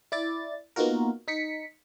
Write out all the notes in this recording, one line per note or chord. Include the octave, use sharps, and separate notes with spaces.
E4 D5 A6
A#3 B3 D#4 F4 F#4 A#4
D#4 B6 C#7